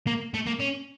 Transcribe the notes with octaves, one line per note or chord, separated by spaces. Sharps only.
A#3
A3
A#3
C#4